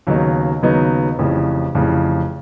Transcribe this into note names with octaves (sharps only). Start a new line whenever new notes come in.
D#2 C#3 F#3 B3 D#4
D#2 C#3 F#3 B3 D#4
F1 F2 C#3 E3
F1 F2 C#3 E3